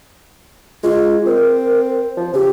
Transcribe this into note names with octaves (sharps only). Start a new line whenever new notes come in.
G#3 F4
C4 A#4
F3
C#3 G4